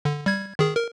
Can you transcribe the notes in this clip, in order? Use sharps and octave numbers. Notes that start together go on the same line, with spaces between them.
D3
G3 G#6
D#3 G#4
A#4